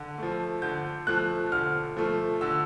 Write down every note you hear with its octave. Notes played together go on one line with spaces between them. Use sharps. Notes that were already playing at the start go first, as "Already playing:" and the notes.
Already playing: D3
F3 A3
D3 G6
F3 A3 F#6
D3 F6
F3 A3
D3 E6